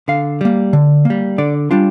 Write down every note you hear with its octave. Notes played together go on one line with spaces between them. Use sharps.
D3 F5
G3 A#3
D3
G3 A#3
D3 D5
G3 D4 F4